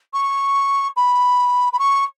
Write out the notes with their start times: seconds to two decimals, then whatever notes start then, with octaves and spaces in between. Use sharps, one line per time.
0.13 C#6
0.96 B5
1.73 B5
1.79 C#6